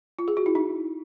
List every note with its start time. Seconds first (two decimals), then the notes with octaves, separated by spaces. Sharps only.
0.19 F4
0.28 G#4
0.37 F#4
0.46 E4
0.55 D#4